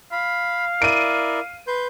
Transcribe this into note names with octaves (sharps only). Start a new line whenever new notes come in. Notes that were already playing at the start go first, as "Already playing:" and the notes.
F5 B5
E4 A#4 D5 D7 D#7
B4 C6 G6